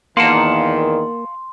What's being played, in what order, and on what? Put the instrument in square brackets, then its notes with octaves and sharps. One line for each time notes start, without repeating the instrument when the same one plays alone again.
[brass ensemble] E2 A#2 D#3 [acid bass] A#3 [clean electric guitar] F5 F#5 A5 [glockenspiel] C6